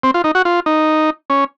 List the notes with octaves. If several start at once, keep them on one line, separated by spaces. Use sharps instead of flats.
C4
F4
D#4
F#4
F4
D#4
C#4